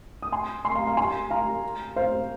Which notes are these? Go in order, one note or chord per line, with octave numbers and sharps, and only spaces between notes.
D#6
G#5 C6
G#5 C6
F5 A#5
F5 A#5
G#5 C6
F5 A#5
C5 F5